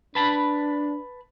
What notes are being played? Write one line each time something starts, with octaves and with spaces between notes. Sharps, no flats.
D4 B4 A5 B5